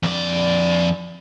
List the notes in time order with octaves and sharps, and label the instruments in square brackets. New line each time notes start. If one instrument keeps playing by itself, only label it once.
[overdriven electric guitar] F2 D5